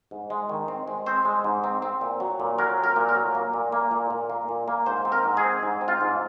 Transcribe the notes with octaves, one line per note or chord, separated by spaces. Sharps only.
G#2
G#3
D#3
C4
G#3
C4 C5
G#3
G#2
C4
C4
A#2
F#3
A#2
F#3 A#4
C4
A#4
A#2
A#4
F#3
A#3
A#2
A#3
A#2
A#2
A#3
A#2
A#3
G#2 C5
C4
A#4
G#2
G#4
C4
G#2
C4
F4
G#2